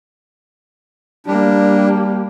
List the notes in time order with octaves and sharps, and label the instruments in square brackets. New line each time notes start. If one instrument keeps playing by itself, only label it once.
[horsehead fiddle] G3 A#3 [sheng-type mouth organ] D4